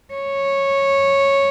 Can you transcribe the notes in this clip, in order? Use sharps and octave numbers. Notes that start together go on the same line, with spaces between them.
C#5